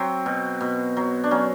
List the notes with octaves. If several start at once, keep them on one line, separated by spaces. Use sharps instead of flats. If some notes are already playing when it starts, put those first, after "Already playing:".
Already playing: F#3 C4
B2
B2
F#3
D4
F#3 C#4